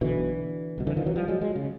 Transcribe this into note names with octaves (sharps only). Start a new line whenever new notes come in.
B1 B2 D3 E3
C2 B2
D3 E3
D#3 F3
E3 F#3
F3 G3
F#3 G#3
F#3 G#3
C#3